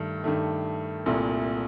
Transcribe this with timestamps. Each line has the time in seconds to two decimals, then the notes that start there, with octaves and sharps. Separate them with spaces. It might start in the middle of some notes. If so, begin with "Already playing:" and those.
Already playing: G2 D#3 A3
0.24 G2 D#3 A3
1.06 C2 A#2 A3